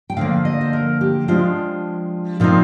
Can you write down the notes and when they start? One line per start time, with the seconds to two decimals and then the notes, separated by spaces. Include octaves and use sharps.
0.10 G5
0.17 D3 F3 A#3 F5
0.45 D#5
0.61 C5
0.73 A#4
1.01 G4
1.28 F3 G#3 D4 F4
2.40 A#2 F3 C4 D#4 F4